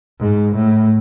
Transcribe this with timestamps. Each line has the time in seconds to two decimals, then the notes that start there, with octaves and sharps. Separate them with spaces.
0.20 G#2
0.55 A2